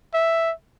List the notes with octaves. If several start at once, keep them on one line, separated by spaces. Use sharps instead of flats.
E5